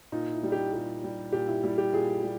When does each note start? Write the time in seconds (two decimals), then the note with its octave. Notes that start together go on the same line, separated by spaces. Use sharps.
0.12 A#2 D#4
0.33 E4
0.43 G3
0.52 G4
0.73 A#2 G4
1.03 G3
1.33 A#2 G4
1.48 E4
1.63 G3 E4
1.78 G4
1.93 A#2 G#4
2.23 G3